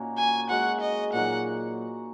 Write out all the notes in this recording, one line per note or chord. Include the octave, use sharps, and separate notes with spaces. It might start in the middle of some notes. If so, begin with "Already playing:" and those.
Already playing: A#2 A#3 C#4 D#4 F#4
G#5
G#3 F#4 C#5 F#5
D#5
A#2 F#3 D#4 F#4 F#5